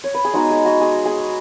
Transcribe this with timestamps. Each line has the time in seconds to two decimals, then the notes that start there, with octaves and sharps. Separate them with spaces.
0.04 C#5
0.14 B4
0.25 G#4
0.34 G#3 B3 D#4 F#4
0.51 G#4
0.66 F#4
0.81 G#4
1.06 G#4